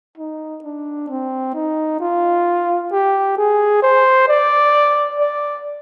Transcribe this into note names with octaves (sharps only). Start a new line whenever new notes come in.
D#4
D4
C4
D#4
F4
G4
G#4
C5
D5
D5